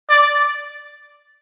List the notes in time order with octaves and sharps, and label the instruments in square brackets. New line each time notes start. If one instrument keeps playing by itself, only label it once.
[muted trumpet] D5